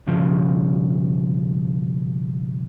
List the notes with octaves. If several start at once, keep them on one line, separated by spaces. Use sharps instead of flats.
B1 G2 C#3 F3